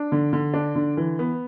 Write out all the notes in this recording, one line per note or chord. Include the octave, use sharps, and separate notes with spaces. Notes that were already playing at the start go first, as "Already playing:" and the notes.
Already playing: D4
D3
D3
D4
D3
E3
B3